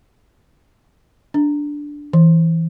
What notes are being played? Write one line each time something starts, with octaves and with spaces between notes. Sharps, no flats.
D4
E3